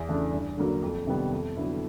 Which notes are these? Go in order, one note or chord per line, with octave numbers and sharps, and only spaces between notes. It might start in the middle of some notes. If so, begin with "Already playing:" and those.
Already playing: E2
C#3 E3 A3 D4
G2
D3 F#3 A#3
F2
C3 D#3 G3 B3
F2
D3 F#3 B3 E4